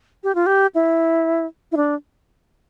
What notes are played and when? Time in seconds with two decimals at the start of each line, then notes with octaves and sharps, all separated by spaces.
0.24 G4
0.35 F4
0.46 G4
0.75 E4
1.72 E4
1.77 D4